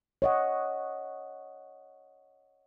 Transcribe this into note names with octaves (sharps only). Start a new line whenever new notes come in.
C#5 D#5 F#5